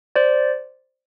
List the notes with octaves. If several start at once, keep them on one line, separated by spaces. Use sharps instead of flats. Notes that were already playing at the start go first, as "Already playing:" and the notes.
C5 D5